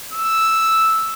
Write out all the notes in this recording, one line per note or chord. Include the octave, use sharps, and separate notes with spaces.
E6